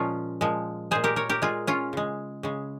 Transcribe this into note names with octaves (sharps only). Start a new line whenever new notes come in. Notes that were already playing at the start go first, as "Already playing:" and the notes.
Already playing: A#2 F3 G#3 C#4 F4
A#2 F3 G#3
A#2 G#3 G#4 C5
G4 A#4
A#4 C#5
G4 A#4
A#2 G#3 F4 G#4
C#4 F4
C#3 G#3
C#3 G#3